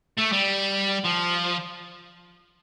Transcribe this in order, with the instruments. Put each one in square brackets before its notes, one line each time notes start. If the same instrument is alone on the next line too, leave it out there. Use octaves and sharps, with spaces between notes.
[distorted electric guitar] A3
G3
F3